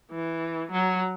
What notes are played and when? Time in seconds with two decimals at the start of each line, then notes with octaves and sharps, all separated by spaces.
0.12 E3
0.72 F#3